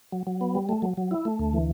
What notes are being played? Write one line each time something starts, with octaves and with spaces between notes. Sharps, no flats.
F#3
F#3
B3
G3
A3
F#3
F#3
E4
A3
D2
E3